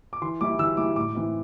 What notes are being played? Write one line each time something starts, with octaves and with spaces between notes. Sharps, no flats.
D6
E3 C6
G3 E4 D6
E3 E6
G3 E4 D6
A2 D6
E3 C4 E4